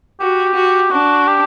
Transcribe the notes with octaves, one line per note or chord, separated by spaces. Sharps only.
F#4 G4
F#4
D4 F#4
G4